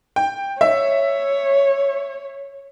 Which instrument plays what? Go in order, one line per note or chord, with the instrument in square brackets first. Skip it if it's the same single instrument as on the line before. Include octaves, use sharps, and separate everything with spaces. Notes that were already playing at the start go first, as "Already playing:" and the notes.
[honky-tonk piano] G5
[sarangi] C#5 [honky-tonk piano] E5